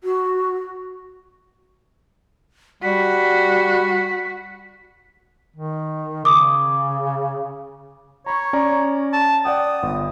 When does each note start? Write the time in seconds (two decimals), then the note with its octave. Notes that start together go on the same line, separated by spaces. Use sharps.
0.03 F#4
2.83 G3 F#4 B6
5.56 D#3
6.25 C#3 D6 D#6
8.26 C#5 A#5 B5 C#6
8.53 C#4 D5 A#5
9.13 A5
9.45 D5 F#5 G5 D#6
9.83 G1